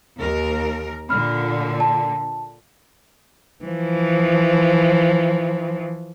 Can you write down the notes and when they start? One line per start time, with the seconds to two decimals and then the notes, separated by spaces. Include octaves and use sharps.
0.17 D#2 A#4
1.09 A#2 D3 B5 F6
1.80 A5
3.64 E3 F3